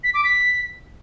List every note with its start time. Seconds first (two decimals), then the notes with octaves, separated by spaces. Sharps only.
0.04 B6
0.14 D6
0.24 B6